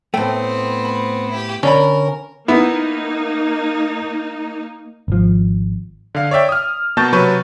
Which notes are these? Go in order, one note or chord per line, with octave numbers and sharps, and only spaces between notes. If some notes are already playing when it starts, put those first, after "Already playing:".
A2 A3 B3 C4 G5
B5
E4 G4
D3 C#4 A#4 D5 B5
A#3 B3 D#4 E4
G#1 F3
D3 F5
C#5 D5 E5 G5
D#6 F6
B2 A#3 A5 C#6 G6 A6
C3 F#3 B4 C#6 G6